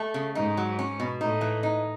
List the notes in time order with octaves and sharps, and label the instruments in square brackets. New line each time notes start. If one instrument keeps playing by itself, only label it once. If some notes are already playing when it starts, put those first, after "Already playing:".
Already playing: [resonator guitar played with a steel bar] A3
C#3
[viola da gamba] G#2 [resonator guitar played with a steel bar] D#4
[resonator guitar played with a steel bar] F#3
C#4
B2
[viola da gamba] A2 [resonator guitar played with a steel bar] D#4
[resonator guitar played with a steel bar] E3
D#4